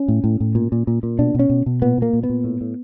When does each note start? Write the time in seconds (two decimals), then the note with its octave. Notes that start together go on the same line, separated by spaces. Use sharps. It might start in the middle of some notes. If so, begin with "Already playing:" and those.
Already playing: C#4
0.08 A2
0.24 A2
0.40 A2
0.55 A#2
0.72 A#2
0.87 A#2
1.03 A#2
1.19 B2 D4
1.35 B2 C#4
1.50 B2
1.66 B2
1.82 A#2 B3
1.98 A#2 A#3
2.13 A#2
2.23 B3
2.30 A#2
2.44 A2
2.61 A2